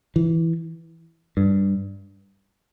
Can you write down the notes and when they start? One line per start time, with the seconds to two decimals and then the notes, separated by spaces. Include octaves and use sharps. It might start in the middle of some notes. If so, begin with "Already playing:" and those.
0.16 E3
1.37 G2